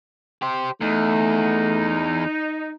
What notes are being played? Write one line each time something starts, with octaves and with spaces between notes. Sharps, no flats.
G4 C5
E2 A3 D#4